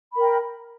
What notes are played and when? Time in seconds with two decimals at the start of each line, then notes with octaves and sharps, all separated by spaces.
0.13 B5
0.17 A#4
0.21 G5